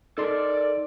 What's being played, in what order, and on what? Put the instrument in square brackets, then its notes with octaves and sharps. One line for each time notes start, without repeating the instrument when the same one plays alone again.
[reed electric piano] D#4 C6 [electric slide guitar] A4 A#4 [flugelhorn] D5